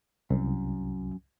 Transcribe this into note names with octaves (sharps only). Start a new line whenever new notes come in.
C2 F#2